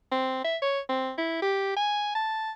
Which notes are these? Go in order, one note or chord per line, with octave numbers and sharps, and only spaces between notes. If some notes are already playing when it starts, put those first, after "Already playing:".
C4
E5
C#5
C4
E4
G4
G#5
A5